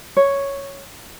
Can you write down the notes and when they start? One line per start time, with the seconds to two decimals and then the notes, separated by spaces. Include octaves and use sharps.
0.17 C#5